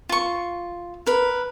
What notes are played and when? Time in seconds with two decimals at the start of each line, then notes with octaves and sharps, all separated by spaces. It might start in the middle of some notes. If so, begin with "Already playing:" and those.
0.09 F4 C#6
1.06 A#4 B4